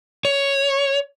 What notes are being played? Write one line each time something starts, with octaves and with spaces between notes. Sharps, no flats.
C#5